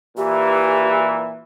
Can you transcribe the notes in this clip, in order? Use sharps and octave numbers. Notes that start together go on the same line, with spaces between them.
A#2 E3 G4